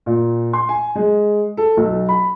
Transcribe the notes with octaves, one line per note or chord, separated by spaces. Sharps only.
A#2
C6
G#5
G#3
A4
B1
B5